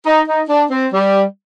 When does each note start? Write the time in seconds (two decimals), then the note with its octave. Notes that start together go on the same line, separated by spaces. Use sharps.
0.06 D#4
0.27 D#4
0.49 D4
0.71 C4
0.93 G3